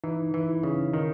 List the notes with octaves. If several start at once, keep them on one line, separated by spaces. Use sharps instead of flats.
E3 D#4
E3
E4
C#3
D#3 D#4